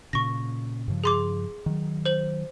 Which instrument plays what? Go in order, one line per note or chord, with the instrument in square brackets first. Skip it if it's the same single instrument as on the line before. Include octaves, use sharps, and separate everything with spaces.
[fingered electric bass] A#2 C#3 [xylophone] C#6 A#6
[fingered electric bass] G2 C#3 F3
[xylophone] G#4 C6 D6
[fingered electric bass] D#3 F#3
[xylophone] C5 F#7